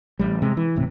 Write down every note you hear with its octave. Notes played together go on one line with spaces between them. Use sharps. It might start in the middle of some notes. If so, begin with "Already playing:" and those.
A1 G3
C3 G#3
E3
D#1 A2 C3